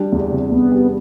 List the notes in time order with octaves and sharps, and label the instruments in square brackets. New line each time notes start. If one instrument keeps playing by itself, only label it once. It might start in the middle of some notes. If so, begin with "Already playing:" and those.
Already playing: [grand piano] G3 D4
E2
C3
[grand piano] E2 [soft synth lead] B3
[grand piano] G3